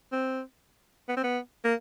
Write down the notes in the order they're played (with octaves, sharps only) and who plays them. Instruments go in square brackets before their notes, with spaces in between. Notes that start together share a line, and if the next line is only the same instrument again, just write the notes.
[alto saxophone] C4
B3
C4
B3
A#3